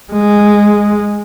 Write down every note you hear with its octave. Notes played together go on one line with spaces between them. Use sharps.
G#3